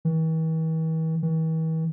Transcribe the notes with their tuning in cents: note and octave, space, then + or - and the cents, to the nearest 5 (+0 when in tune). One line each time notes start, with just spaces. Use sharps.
E3 -45
E3 -45